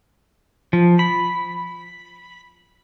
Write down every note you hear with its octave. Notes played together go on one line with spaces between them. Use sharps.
F3
B5